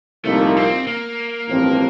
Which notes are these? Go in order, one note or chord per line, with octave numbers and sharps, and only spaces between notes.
C2 A#2 F3 A3 A#3 D#4
C4
A#3
A1 G2 F3 C4